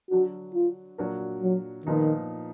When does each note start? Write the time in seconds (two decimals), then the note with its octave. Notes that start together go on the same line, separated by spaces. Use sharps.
0.10 D3 F#3 D4 F#4
0.54 F4
0.98 A#2 F#3 D4 F#4 A#4
1.43 F#3
1.85 A#2 D#3 F3 B3 D#4